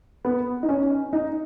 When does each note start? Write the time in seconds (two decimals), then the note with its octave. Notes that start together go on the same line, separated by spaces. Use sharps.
0.25 B3
0.63 D#4
0.69 C#4
1.13 D#4